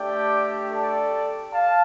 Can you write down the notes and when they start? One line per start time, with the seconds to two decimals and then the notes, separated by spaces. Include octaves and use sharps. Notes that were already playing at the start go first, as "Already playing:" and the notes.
Already playing: A3 D4 G4 D5 G5
0.72 A4 D5
1.54 F5 A5